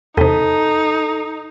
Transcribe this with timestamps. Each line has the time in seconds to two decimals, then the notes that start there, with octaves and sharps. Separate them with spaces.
0.17 E2 C3 D#4 A4